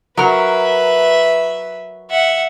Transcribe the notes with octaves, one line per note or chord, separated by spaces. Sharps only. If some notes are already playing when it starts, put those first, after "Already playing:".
F#3 A#4 B4 E5
E5 F#5